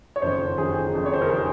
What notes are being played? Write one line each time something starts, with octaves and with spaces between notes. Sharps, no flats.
C#5
F#1 F2 D#3 C5
F#1 F2 D#3 G#4
F#1 F2 D#3
C#5
C5
A#4
D#3 G#4